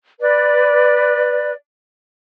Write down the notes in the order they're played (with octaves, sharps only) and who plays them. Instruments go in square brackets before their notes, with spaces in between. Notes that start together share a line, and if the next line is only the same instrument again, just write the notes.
[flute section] B4 D5